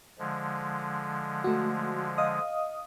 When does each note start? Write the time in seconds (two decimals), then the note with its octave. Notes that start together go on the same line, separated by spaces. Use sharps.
0.19 D3 F3 G#3
1.44 A3 F#4
2.18 D#5 F5 D#6